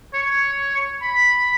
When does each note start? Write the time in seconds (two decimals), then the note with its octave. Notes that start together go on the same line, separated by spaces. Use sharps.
0.14 C#5
1.02 B5